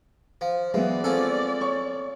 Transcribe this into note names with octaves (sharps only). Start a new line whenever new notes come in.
F3
E3 F#3 G#3 B3 D5
F3 C4 C#4 A4
C#5 C#6